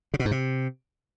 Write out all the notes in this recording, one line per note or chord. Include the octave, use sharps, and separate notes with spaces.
C#3
B2
G#2
C3